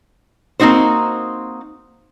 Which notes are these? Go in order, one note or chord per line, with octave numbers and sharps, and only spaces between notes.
A#3 C4 D#4 F#4 C5